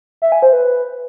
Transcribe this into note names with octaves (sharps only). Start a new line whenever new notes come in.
E5
G#5
C5
B4